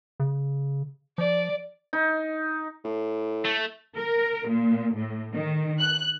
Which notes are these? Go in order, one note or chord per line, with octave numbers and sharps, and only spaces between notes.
C#3
F3 D5
D#4
A2
A3
A#4
A#2
A2
D#3
F#6